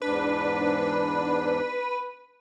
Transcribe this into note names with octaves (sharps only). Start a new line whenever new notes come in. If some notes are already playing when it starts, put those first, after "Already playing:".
E2 G#2 D4 B4